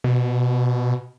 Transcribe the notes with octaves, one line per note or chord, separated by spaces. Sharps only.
B2